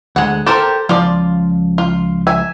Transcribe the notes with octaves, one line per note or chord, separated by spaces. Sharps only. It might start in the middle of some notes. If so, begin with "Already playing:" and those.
D2 G#3 F#5
G4 A4 A#4 C5
C#2 F3 F4 D5
F4
E5 G#5